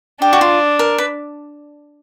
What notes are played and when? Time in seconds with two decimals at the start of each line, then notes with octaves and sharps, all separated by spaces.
0.22 D4 G4
0.33 F#4
0.41 F4
0.79 A#4
0.98 B4